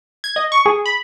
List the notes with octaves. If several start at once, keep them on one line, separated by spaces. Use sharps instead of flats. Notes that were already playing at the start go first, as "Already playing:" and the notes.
G#6
D#5
C#6
G#4
B5